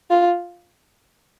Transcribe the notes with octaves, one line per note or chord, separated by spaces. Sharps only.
F4